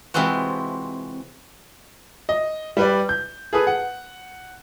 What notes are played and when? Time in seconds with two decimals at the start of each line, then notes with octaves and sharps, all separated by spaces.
0.14 C3 E3 G#3 C4 F4 F#4
2.29 D#5
2.77 G3 B4 D5
3.09 G6
3.53 G#4 A4 B4 D#6
3.67 F#5